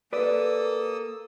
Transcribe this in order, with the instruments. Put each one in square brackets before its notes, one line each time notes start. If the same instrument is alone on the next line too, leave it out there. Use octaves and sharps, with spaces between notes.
[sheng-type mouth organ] A#3 D#6 E6 [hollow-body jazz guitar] G4 B4 D5 [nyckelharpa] A4